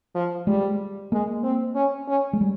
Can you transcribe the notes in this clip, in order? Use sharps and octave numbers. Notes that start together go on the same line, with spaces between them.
F3
G3 G#3
G#3 A#3
C4
C#4
C#4
G#3
G3